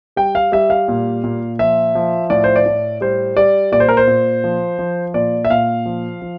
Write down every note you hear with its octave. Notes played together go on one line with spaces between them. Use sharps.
G3 G5
F5
G3 E5
F5
A#2
A#2
F3 E5
F3
A2 D5
C5
D5
A2
G3 C5
G3 D5
A#2 D5
C5
A#4
C5
A#2
F3
F3
A#2 D5
E5
A#2 F5
F3
F3